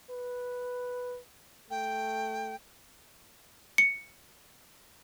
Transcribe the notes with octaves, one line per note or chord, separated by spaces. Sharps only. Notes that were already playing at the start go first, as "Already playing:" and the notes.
B4
A3 G5
C#7